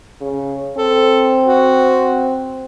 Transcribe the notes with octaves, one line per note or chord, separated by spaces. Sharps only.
C#3
C4 A4
F#4